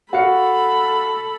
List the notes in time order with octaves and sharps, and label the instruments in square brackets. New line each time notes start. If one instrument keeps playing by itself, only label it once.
[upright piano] F#4 F5 C#7 [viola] A4 B5